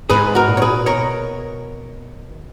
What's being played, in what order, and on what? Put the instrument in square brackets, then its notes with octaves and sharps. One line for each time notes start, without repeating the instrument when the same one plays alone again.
[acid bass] G#2 [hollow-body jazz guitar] G#4 B4
[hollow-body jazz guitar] F#4 A#4
[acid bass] A#2
[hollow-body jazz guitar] C#5
G#4 B4
[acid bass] B2 [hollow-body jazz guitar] A#4 C#5
[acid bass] D#3